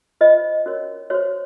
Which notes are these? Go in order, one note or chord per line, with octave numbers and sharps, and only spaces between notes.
F4 C5 D#5
C#4 F#4 A#4 C#5
F#4 C5 C#5